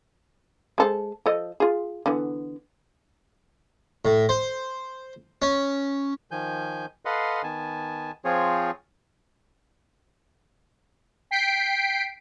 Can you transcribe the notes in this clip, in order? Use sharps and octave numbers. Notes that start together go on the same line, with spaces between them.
G#3 A4 C5
F3 A4 D#5
F4 G#4
D3 E3 B3
A2
C5
C#4
D#3 F3 G#5 G6
A4 B4 D#5 F5 F#5 C6
D#3 B3 G#5 A5
F3 C4 F4 G#4 C#5
G5 B6 C7 D7